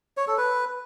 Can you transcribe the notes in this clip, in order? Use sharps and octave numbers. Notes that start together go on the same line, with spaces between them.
C#5
A4
B4